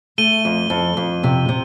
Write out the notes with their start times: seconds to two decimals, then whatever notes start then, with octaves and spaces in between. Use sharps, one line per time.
0.18 A3 D#7 G7
0.45 F2
0.70 F2
0.97 F2
1.24 C3
1.49 C3